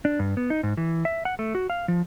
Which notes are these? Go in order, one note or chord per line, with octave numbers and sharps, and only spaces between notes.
D4
G2
B3
D#4
G#2
E3
E5
F#5
A3
F#4
F5
F3